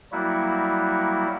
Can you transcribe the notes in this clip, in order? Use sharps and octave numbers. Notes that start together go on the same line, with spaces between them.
F#3 G3 A#3 E4 F#4